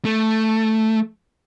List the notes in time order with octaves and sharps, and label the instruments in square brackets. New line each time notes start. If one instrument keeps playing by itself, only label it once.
[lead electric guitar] A3